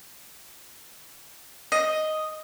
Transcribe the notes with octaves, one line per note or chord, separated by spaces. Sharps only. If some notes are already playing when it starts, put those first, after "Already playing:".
D#5